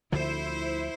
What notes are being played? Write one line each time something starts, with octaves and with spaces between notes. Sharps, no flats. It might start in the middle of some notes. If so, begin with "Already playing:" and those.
D2 D3 F3 E4 C5